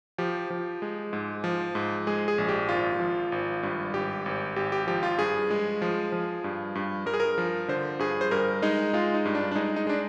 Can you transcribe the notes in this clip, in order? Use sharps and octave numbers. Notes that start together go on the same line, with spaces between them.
F3 G4
F3
G#3
G#2
F3
G#2
G#3 G#4
G#4
A#1
G4
G#1 F4
F3
G#1
G2
G#1 G4
G#1
G#1 G4
G4
F3 G4
F4
G2 G#4
G#3
F3
F3
G2
G2
G2 A#4
G#4
A#4
F3
D3 C5
G2 G#4
C5
G2 A#4
G#3 D#4
G#3 F4
D#4
G2
D4
D4
G#3 D#4
D#4
G#3 D4